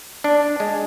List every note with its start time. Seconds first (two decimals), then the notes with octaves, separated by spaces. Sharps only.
0.24 D4
0.60 G#3